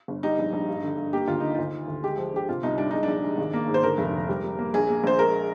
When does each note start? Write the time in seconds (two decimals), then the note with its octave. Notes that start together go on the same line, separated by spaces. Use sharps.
0.08 G1
0.23 G3 D#4
0.39 A#1
0.53 A#1
0.68 G2
0.84 D3
0.98 G2
1.13 A#3 G4
1.28 D2 F4
1.40 D3 D#4
1.55 D2 F4
1.73 D#3
1.88 D2
2.03 G#3 G4
2.18 F3
2.33 D3 G4
2.49 C3 F4
2.63 C2 D#4
2.78 G3 D4
2.91 G#3 D#4
3.03 A#1 D4
3.24 G#3
3.38 G#1
3.53 A#3
3.68 G#2
3.74 C5
3.83 D3 A#4
3.98 F1
4.13 D3
4.29 G3
4.44 G3
4.59 A#3
4.74 A#1 G#4
4.89 A#3
5.04 A#1 C5
5.19 G#3 A#4